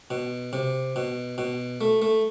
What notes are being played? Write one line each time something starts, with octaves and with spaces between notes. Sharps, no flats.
B2
C3
B2
B2
A3
A3